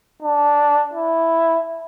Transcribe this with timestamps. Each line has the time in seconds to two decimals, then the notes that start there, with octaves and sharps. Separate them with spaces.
0.23 D4
0.94 E4